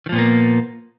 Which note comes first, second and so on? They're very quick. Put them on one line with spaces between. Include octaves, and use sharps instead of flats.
D#3 F3 A#2 B3 A#3